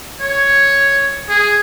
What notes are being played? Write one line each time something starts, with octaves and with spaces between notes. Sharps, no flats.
C#5
G#4